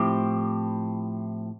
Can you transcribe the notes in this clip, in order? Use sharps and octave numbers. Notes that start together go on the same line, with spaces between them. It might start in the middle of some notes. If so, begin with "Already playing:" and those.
Already playing: A2 F3 C4 E4 G4